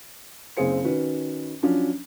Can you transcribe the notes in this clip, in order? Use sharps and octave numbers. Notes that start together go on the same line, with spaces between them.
F#1 C#3 C4 G#4 C5 C#7
D#3 C#4 F#4 B4
F3 F#3 C#4 D4